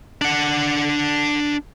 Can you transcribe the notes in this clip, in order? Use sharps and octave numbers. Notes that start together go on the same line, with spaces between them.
D4 F#5